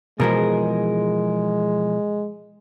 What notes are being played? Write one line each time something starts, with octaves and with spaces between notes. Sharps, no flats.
B2 E3 F3 G#3 G#4 A#4